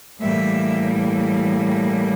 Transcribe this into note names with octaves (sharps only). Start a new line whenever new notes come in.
A2 E3 G3 A#3 E5